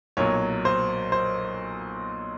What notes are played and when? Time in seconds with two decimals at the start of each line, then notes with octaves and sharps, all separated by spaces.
0.17 B1 A#2 F#3 C#5
0.65 C5
1.12 C5